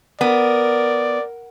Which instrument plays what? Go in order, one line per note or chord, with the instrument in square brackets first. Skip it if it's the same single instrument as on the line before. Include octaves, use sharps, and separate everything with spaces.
[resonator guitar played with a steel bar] B3 [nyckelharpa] A#4 [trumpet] D5